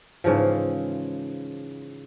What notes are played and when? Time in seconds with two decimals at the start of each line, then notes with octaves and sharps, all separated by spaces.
0.24 G#2 C#3 E3 F3